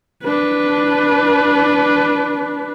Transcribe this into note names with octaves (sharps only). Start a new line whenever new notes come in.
D4 B4